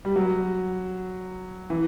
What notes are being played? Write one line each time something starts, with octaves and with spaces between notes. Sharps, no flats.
G3
F#3
E3